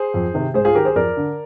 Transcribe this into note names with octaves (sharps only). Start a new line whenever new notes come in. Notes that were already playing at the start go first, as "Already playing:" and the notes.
Already playing: G#4 C5
F2
C3 D#3
G#2 G#4 C5
F4 G#4
D#3 G4 A#4
G#4 C5
F2 A#4 D5
D3